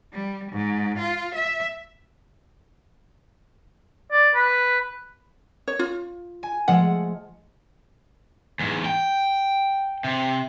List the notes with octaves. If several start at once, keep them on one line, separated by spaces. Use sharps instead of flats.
G3
G#2
F4
E5
D5
B4
C#5
F4
G#5
F3 G#3 A3 F#5
E2 G#2
G5
C3